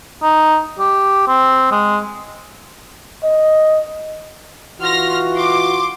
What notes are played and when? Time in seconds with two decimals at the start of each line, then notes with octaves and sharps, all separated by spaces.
0.23 D#4
0.79 G4
1.27 C4
1.71 G#3
3.24 D#5
4.80 E3 F4 F#4 C6 F6 A#6
5.36 C6 D6